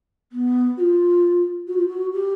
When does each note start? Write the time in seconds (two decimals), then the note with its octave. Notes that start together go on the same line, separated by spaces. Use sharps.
0.32 B3
0.77 F#4
0.81 F4
1.68 F#4
1.77 F4
1.87 F#4
2.13 G4